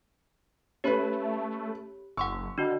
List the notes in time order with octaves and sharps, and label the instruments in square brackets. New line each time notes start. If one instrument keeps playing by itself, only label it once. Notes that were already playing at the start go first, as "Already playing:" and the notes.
[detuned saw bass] A3 [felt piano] C#4 B4 [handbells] G4 C#5 B5
[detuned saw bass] F#1 [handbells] F#5 C6 E6 [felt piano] C#6
[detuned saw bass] D3 [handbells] D4 F#4 D#5